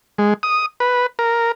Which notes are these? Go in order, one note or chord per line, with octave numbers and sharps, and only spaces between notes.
G#3
D#6
B4
A#4